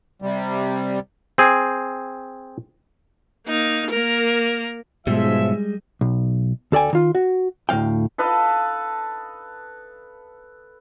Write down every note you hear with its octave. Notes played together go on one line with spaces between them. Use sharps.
C3 G3
C4 G#4
A#3 D#4
A#3 A#4
B1 G#2 B2 F3 G3 G#3 E5
B1
D2 A4 D5 G5 G#5
D#3 F4
F#4
D2 A2 A#3 F5 G5
A4 B4 D#5 F5